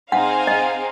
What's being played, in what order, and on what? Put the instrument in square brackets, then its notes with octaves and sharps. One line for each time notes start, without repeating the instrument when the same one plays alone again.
[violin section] C4 D#4 G#4 C5 F5 [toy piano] F#5
[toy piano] D#5